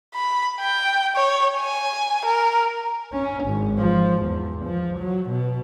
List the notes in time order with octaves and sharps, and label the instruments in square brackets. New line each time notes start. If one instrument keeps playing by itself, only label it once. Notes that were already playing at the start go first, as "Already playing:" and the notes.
[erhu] B5
G5
C#5
G#5
A#4
[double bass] C#4
G#1
F3
E2
F3
F#3
B2